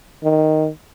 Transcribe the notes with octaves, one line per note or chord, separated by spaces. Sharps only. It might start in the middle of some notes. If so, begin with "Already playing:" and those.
D#3